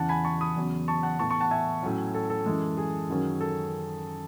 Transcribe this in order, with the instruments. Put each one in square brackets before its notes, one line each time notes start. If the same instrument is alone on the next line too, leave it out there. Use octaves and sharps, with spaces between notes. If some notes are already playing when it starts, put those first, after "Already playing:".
Already playing: [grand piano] E2 C#3 E3 F#5 A5
G#5 B5
A5 C#6
B5 D#6
E2 C#3 F#3 B3
A5 C#6
F#5 A5
A2 E3 B3 A5 C#6
A5 C#6
F#5 A5
E5 G#5
A2 F#3 C#4
A4
A4
F#2 E3 G#3
G#4
F#2 D#3 F#3 C#4
A4